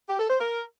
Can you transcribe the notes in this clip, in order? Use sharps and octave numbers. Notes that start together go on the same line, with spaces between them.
G4
A4
C5
A#4